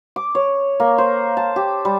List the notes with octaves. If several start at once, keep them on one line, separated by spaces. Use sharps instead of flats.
D6
C#5
A#3
C5
A5
G4
G3